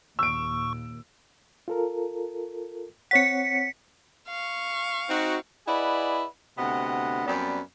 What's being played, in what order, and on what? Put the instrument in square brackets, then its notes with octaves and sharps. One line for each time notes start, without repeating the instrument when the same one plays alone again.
[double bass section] D#2 A#2 [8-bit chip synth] C#6 [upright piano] E6 D7
[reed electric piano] F4 A4 A#4
[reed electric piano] C4 C#5 F#5 [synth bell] B6 C#7
[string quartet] F5 C#6
[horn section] C4 D#4 F#4
[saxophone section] E4 G#4 B4 D5 D#5 F#5
D2 C3 B3 D#5 F#5
F#2 G3 B3 C4 D5